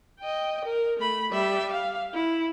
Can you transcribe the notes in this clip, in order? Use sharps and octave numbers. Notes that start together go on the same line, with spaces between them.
D#5 G5
A#4
A3 B5
G3 E5
F5
E4